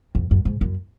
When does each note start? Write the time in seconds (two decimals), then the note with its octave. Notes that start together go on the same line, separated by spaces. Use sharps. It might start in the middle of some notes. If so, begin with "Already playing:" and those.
0.15 F2
0.31 F#2
0.45 G#2
0.61 F#2